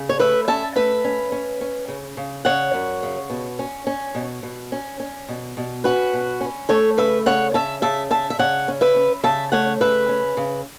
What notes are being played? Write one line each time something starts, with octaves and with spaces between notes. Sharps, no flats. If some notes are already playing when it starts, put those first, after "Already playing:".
Already playing: C#3
C#5
A3 B4 E5
C#4 E5 A5
A3 B4 E5
C#4
C#4
C#4
C#3
C#3
C#3 C#5 F#5
F#2
C#3
B2
C#4
C#4
B2
B2
C#4
C#4
B2
B2
C#4 F#4 B4
B2
C#4
A3 A4 C#5
C#3 B4 E5
C#3 C#5 F#5
C#4 E5 A5
C#3 E5 A5
C#3 E5 A5
E5
C#3 C#5 F#5
C#4
B4 E5
C#4
C#3 E5 A5
A3 C#5 F#5
C#3 B4 E5
C#4
C#3